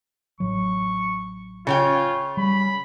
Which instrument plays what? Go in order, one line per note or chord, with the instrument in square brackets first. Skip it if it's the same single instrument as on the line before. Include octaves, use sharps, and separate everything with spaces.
[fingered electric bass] A1 F#3 [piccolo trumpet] C#6
[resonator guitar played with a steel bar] C#3 C#5 G5 [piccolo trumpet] F4
[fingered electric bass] G3 [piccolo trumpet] B5